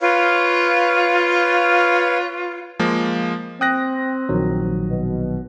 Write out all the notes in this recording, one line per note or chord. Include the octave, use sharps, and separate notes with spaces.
F4 B4 C#5 F5
F3 G#3 A#3
C4 G5 D#6 F#6 A#6
A#1 D#3 F#3
B2